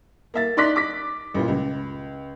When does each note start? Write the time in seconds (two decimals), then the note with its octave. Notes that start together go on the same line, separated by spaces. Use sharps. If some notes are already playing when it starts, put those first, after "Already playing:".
0.34 A#3 E5 A6
0.57 D#4 D5 C6 D6 F#6 B6
0.76 D6 B6
1.34 A1 A#2
1.48 C#2